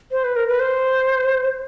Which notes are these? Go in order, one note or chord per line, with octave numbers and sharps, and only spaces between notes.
C5
B4
A#4
B4
C5